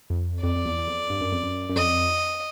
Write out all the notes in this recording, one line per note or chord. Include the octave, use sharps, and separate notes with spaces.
F2
F2 D5
F2
E2
E2
F2
G2
F#2
F2
F#2
F#2
F2 D#5